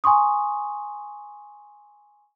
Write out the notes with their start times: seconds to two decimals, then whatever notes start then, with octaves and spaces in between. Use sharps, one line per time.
0.04 G#5 C6 C#6 D#6